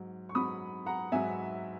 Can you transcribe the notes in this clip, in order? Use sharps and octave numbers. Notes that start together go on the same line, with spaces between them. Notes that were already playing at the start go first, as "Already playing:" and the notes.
Already playing: G#2 F#3
C#6
G#2 F#3 B5 D#6
F#5 A#5
G#2 F#3 E5 G#5